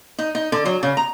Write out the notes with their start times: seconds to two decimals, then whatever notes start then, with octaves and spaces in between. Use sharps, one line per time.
0.19 D#4
0.35 D#4
0.52 D3
0.65 F#3
0.83 C#3
0.97 A#5